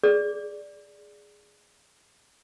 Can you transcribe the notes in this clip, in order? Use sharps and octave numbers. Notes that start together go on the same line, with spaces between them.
G#4 D5